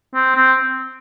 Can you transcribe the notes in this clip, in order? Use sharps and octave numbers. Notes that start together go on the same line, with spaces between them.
C4
C4